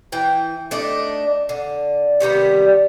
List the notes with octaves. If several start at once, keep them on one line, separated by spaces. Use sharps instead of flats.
E3 G5
A3 D4 D#4
D3
C3 D#3 G3 B3